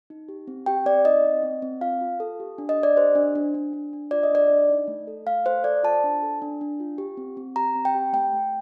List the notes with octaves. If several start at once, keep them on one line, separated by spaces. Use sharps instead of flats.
D#4
G4
C4
G4 G5
C4 D5
D#4 D#5
C4
C4
C4
F4 F5
F4
A4
G4
D4
D#5
D4
D5
G4 C5
D4
D4
D4
D4
D4
F4 D5
D#5
D4 D5
D4
D#4
A3
A4
A3 F5
A4 C5
A4 D5
F4 A5
D4
A4
D4
D4
F4
G4
C4
C4
G4 A#5
C4
G5
G4
A3 G5
A3